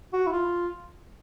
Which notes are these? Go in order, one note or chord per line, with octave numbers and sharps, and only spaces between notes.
F#4
E4
F4